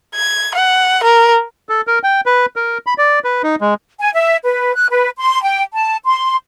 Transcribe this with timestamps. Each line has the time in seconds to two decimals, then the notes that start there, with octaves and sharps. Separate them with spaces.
0.15 G#6
0.55 F#5
1.04 A#4
1.69 A4
1.87 A#4
2.03 G5
2.26 B4
2.56 A#4
2.86 B5
2.98 D5
3.24 B4
3.43 D#4
3.61 G#3
4.00 G#5
4.14 E5
4.44 B4
4.76 F#6
4.90 B4
5.19 C6
5.43 G5
5.73 A5
6.05 C6